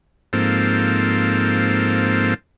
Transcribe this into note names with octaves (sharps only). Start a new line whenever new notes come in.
G#2 F3 A#3 C4 A4